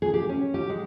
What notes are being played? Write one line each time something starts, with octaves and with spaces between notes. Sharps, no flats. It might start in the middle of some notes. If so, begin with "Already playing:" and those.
G#4
G4
C#4
G4
G#3